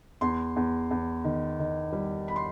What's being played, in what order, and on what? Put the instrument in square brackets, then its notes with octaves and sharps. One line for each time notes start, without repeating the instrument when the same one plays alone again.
[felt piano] E2 C6
E2
E2
D#3
D#3
G3
B5
C6